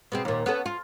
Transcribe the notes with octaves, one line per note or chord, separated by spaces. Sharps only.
B2 G#3 C4
D#2 A#2
B3 C#4 A4
F4